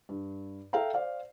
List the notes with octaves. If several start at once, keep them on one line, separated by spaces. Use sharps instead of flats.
G2
A4 E5 F5 G5 A#5
C5 D5 F5